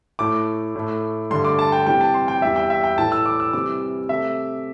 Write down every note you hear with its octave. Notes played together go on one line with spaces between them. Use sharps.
A2 A3 D6
A2 A3
G2 D3 A3 C6
D6
A5
G5
C3 E3 G3 G5
A5
C6
G5
E2 E3 G3 E5
G5
E5
G5
A2 E3 A3 A5
E6
D6
E6
C3 E3 G3 D6
C3 A3 E5